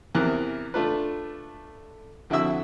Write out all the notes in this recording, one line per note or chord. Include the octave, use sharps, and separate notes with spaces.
E2 C3 E3 A#4 F#6
A3 D4 F4 B4
F2 D3 E4 F#4 E5 E6